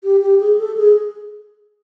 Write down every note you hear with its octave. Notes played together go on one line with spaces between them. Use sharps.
G4
G4
G#4
A4
G#4